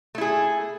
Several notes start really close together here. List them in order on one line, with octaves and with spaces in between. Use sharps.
A3 E4 G#4